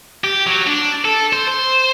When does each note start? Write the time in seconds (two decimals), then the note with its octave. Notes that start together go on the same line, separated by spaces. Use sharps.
0.24 G4
0.46 F#3
0.67 D4
1.05 A4
1.33 C5
1.48 C5